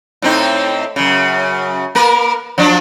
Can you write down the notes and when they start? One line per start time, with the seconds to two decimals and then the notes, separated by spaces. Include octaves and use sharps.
0.22 A2 C4 D#4
0.96 F#2 C#3
1.95 A#3 A#4 B4
2.58 F3 F#3 D4